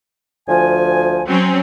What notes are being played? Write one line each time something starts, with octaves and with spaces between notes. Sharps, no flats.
D2 F3 G#5
F#3 C4 C#4